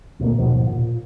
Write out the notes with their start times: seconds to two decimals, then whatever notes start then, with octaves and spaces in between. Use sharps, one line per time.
0.19 D2 A#2 F#3 A#3
0.38 D#2 G#2 B2 F3
0.66 A#2